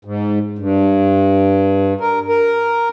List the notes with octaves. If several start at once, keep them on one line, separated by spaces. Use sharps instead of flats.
G#2
G2
A#4
A#4